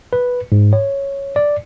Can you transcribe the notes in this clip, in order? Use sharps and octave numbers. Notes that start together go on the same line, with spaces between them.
B4
G#2
C#5
D5